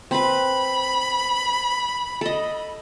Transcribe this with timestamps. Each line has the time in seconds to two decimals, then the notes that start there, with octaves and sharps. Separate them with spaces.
0.11 C4 B4 B5
2.21 A4 D#5